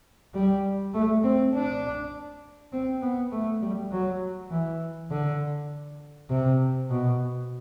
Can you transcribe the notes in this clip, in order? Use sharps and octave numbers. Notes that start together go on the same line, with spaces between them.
G3
A3
C4
D4
C4
B3
A3
G3
F#3
E3
D3
C3
B2